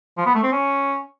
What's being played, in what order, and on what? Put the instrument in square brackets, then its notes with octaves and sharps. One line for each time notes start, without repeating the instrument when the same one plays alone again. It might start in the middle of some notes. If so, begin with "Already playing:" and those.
[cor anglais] F3
B3
A3
C4
C#4